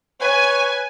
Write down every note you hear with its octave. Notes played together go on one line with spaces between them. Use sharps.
B4 C#5 G#5